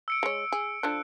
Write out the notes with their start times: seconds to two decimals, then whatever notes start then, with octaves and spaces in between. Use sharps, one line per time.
0.08 E6 C#7 D7
0.23 G#3 C#5
0.52 G#4
0.83 D3 F3 D4 F#6